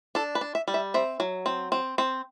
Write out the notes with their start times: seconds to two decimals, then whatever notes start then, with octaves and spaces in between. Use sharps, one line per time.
0.15 D4 A4
0.35 B4
0.41 D4
0.55 E5
0.68 G3
0.74 E5
0.94 C4 E5
1.20 F#3
1.46 C4
1.72 C4
1.98 C4